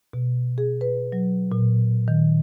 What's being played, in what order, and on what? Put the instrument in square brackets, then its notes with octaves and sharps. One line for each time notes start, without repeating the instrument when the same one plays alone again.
[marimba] B2
G#4
B4
F#3
A#2
D#3